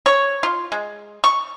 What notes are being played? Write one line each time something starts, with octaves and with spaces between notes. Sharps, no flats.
C#5
F4
G#3
C#6